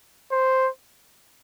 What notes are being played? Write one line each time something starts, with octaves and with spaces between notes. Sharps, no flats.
C5